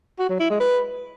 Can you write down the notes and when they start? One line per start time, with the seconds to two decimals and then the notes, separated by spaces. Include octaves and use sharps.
0.19 F#4
0.29 F#3
0.40 E4
0.50 G#3
0.60 B4